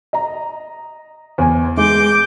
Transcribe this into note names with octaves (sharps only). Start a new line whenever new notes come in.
D#5 A#5
E2 G#5
G#3 D6 G6